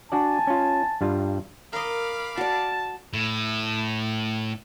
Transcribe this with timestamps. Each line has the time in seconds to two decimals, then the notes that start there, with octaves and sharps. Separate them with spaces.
0.12 D4 F#4 D5 G#5 A5
0.47 C#4 F4
1.01 G2 G3 F4
1.73 A#4 D#5 F5 B5 D6
2.37 F#4 D5 A5
3.13 A2